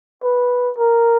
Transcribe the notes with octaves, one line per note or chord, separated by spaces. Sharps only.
B4
A#4